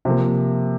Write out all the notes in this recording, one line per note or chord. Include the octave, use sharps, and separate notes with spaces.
C3 F3 A#3